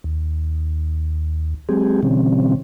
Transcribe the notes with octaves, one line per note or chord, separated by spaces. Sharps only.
D#2
F#3 G#3 C4 G4 G#4
B2 D3 E3 G3 C4 C#4